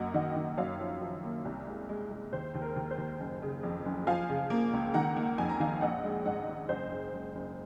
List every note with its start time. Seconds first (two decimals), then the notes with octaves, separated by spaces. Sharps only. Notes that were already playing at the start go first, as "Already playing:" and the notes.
Already playing: F#2 A#3 D#5 F#5
0.14 D#3 D#5 F#5
0.36 D#3
0.57 F#2 C#5 F5
0.80 F3
1.01 F3
1.23 A#3
1.45 C2
1.67 G#3
1.89 G#3
2.11 G#3
2.33 D#2 C5
2.54 D#2
2.62 A#4
2.76 D#2
2.91 C5
2.97 D#2
3.20 F#1
3.42 C#3
3.63 F2
3.85 F#1
4.07 F3 F5 G#5
4.29 C#3
4.50 A#3
4.73 C#2
4.94 D#3 F#5 A#5
5.16 A#3
5.38 F2 G#5
5.49 A#5
5.60 D#3 F5 G#5
5.81 A#1 D#5 F#5
6.04 G#3
6.25 G#2 D#5 F#5
6.47 G#3
6.69 F#1 C5 D#5
6.91 F#1
7.13 F#1
7.35 F#1